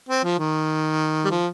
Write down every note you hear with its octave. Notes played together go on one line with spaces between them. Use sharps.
C4
F3
D#3
G3
F3